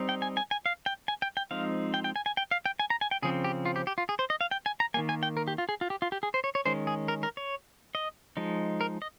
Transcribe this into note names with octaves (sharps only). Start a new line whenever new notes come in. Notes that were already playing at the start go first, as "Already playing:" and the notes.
Already playing: G3 C4 D#4
G5
G#5
G#5
G#5
F5
G5
G#5
G5
G5
F3 G#3 C4 D#4 F5
G5
G5
G#5
G#5
G5
F5
G5
G#5
A#5
G#5
G5
C#3 F3 C4 G#4
G4
F4
G4
G4
F4
G#4
C5
D#5
F5
G5
G#5
A#5
D#3 G3 A#3 G#5
G#5
G5
A#4
G4
F4
G#4
F4
G4
F4
G4
G#4
C5
C#5
C#5
D#3 G#3 C#4 C5
G#4
A#4
A#4
C#5
D#5
F3 G#3 D#4
A#4
D#5